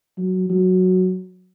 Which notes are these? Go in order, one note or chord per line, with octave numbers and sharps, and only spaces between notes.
F#3
F#3